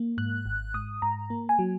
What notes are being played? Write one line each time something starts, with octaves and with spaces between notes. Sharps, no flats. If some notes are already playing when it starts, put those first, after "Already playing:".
Already playing: A#3
G#2 F#6
G#1
G#2 D#6
G#2 A#5
A#3
G#5
F#3